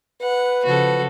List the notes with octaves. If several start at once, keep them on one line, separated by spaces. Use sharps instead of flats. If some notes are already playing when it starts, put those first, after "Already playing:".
B4 F#5
C#3 F3 F#4 A4